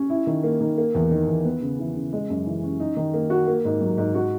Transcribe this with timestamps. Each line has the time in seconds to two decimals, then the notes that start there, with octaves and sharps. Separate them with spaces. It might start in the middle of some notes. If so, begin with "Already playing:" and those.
Already playing: C#4
0.10 E4
0.27 D#3
0.44 A#3
0.61 D#3
0.78 A#3
0.95 E2
1.11 D#3
1.28 E2
1.45 B3
1.62 C#3
1.79 E3
1.95 C#3
2.13 G#3
2.30 F#2
2.46 E3
2.63 C#4
2.80 D#4
2.97 D#3
3.14 A#3
3.30 F#4
3.47 A#3
3.65 G#2
3.81 F#3
3.97 G#2
4.14 F#4